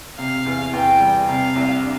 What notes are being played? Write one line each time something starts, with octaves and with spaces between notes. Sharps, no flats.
C3 F5
E2
E2 G5
G3
C3 F5
C2
D4